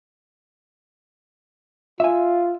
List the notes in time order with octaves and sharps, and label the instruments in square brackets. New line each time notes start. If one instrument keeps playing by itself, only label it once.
[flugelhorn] F4 [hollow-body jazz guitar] E5 G#5